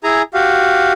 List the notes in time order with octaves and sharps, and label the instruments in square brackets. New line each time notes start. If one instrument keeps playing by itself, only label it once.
[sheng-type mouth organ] E4 G#4 G#5 A#5
F#4 G4 F5